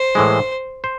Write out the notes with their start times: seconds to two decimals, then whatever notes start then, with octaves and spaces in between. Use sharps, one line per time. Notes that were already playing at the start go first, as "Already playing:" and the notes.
Already playing: C5
0.15 A2 E3 G#3
0.84 C5